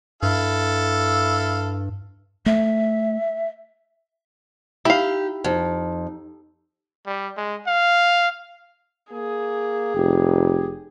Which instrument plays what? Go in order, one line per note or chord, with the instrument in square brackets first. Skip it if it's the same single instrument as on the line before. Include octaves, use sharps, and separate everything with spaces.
[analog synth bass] G2 [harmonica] E4 A4 F5
[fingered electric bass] A3 [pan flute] E5
[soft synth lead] D#4 [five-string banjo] E4 F5 [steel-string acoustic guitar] G4
[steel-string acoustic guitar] F2 [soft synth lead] D#4
[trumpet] G3
G#3
F5
[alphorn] A#3 [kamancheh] G#4
[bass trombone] F1 [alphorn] G4